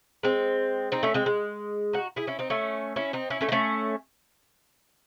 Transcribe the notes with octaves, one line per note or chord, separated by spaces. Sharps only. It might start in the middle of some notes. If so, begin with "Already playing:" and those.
G#3 C4
C4 D#4
A3 C#4
G#3 C4
G#3
D#4 F#4
E4 G#4
C#4 E4
C4 D#4
A3 C#4
C#4 E4
C4 D#4
C#4 E4
A3 C#4
D#4
A3 C#4